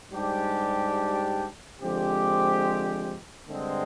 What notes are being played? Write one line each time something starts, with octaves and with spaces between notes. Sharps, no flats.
G#2 G3 D4 G4
D3 F3 G#3 C4 G4
G2 D3 G#3 C4